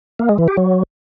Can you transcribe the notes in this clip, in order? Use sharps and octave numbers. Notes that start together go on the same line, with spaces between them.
A#3
G#3
E3
G4
F#3